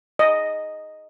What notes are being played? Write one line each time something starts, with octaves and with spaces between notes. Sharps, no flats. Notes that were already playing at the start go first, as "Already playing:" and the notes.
D#5